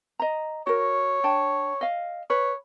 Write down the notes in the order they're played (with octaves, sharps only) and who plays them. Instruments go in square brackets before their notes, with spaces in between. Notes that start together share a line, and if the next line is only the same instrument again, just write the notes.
[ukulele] D#5 A#5
[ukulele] F#4 A#4 [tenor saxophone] C#5
[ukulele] D4 G5 A5
D#5 F5
[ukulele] B4 [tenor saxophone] C#5